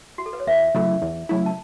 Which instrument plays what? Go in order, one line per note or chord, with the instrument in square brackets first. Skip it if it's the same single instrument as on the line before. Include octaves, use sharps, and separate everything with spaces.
[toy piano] F#4
A4
B4
C#5
[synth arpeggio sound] E2 [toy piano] B4 E5
[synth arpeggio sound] C#3 F#3 A3 E4
E2
C#3 F#3 A3 E4
[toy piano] A5